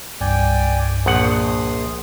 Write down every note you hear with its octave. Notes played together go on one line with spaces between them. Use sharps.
C2 G2 D5 G5 G#5
A#1 F#5 C6 D#6